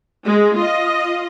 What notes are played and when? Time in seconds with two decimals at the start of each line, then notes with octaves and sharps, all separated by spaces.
0.24 G#3
0.56 F4 D#5